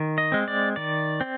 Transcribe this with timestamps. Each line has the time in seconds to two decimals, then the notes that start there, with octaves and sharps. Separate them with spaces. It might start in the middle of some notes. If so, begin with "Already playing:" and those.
Already playing: D#3
0.18 D#5
0.32 G#3 C4
0.48 D5
0.76 D#3 D5
1.21 C4